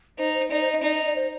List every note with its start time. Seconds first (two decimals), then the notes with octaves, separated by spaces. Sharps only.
0.18 D#4 C5
0.35 C5
0.51 D#4 D5
0.61 C5
0.72 D#5
0.83 D#4 D5
0.94 D#5
1.05 D5
1.16 C5